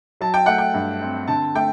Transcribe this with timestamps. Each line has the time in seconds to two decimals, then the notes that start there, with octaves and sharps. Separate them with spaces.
0.21 F#3 A5
0.34 G5
0.46 A3 F#5
0.58 G5
0.74 G2
1.02 C4
1.28 D3 A5
1.55 A3 G5